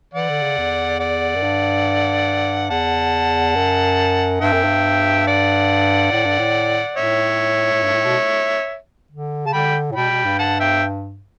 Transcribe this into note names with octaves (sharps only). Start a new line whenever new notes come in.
E3 D5 F#5
D3
C#3
E2
D5 F#5
F#2
G2
E2 F#5 A5
F#2
G2 E5 G5
F#2
G2
D5 F#5
A2
G2
A2
A2 C#5 E5
A2
G2
A2
B2
D3
C#3 A5
D3 G5 B5
A2
B2 G5 B5
B2
G2
F#5 A5
E5 G5